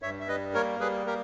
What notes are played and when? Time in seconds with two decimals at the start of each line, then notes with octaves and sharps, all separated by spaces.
0.02 G2 C#5 E5
0.20 E5
0.28 G3 B4 D#5
0.54 A#3 A#4 C#5
0.80 G3 G#4 B4
1.06 A#3 G4 A#4